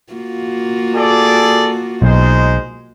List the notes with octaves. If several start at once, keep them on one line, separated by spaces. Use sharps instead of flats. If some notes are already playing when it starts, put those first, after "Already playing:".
A#3 F4 F#4
G#4 A4 D5
B1 G#3 D#4 C5